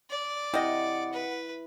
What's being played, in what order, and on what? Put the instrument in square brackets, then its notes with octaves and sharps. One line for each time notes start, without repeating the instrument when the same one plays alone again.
[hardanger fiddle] D5
[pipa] C3 D#5 [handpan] E4 [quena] F#5
[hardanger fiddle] B4